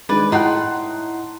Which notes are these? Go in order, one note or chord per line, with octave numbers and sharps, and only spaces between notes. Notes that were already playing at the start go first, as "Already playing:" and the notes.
D#3 G#3 B4 D5 G#5
A2 D#4 F#5 G5 C6 F#6